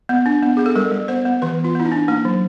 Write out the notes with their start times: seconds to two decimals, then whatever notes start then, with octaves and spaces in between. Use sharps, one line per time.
0.09 B3
0.26 D4
0.42 B3
0.57 B3 G#4
0.66 A4
0.76 G3 A#4
0.92 G3
1.08 B3 C5
1.25 B3
1.42 E3 B4
1.59 B3
1.64 F4
1.75 B3 E4
1.86 D#4
1.92 D4
2.08 A#3 D#4
2.25 F#3